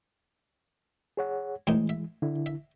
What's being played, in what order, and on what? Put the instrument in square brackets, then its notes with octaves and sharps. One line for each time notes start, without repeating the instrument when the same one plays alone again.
[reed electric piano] G#4 C#5 F#5
[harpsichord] D2 A2 D#4 [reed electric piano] E3 G#3
[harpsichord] E5
[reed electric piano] D3 E4
[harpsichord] E5